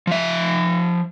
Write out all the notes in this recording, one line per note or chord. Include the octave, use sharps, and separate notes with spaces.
F3 E5